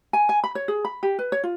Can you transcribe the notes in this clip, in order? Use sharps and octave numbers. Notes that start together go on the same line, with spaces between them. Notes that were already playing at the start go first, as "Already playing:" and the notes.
G#5
G#5
B5
C#5
G#4
B5
G4
B4
C#5
F4